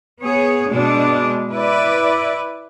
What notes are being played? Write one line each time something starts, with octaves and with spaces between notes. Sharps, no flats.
B3 G#4 C#5
B2 G#3 D4
E4 B4 D5